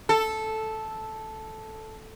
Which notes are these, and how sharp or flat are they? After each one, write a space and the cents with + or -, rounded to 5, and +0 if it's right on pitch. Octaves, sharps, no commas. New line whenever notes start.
A4 -5